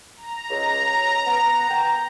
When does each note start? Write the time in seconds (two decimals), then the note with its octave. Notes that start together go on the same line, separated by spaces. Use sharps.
0.17 A#5
0.50 C#2
1.26 B3
1.69 G5 A#5